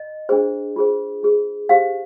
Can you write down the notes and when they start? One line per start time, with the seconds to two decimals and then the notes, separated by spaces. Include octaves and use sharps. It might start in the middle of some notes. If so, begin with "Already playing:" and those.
Already playing: D#5
0.29 D4 F4 G#4 C5
0.76 F4 G#4 C5
1.23 F4 G#4 C5
1.69 D#4 G4 C5 F5